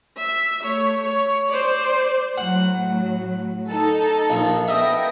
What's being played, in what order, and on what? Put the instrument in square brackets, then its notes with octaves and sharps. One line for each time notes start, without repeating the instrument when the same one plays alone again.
[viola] E5
A3 C#5
C#5
C5 D5
[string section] A2 F#3 [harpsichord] F#5
[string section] D#4 A4
[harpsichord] A#1
[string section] B3 G5 A#6 [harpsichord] D#5 E5